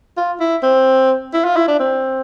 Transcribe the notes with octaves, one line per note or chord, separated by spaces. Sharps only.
F4
E4
C4
E4
F4
E4
D4
C4